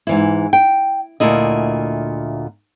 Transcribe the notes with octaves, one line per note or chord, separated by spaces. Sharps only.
G#2 E3 E4
G5
D2 A#2 E4 D#5